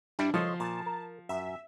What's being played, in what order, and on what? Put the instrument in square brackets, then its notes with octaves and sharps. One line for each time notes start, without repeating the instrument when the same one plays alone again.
[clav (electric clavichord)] G2 G3 E4 [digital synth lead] D4
[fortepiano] F3 [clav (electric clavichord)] A4 C#5 D#5 [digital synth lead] C6
[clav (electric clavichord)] A#2 [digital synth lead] A5
[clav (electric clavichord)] A#4
[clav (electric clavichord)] F#2 [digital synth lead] E5